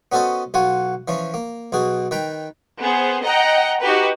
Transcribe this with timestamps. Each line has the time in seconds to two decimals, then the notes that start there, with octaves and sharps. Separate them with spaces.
0.12 B3 C#4 F#4 A4 C5 D#5
0.54 B1 F4 F#4 F#5 G#5
1.08 E3 F3 C#4
1.34 A#3
1.72 B1 B2 F#4 G#4
2.11 D#3 B4 G5 A#5
2.80 B3 G#4 C5
3.23 D#5 F#5 G5 A#5
3.81 D#4 F#4 G4 B4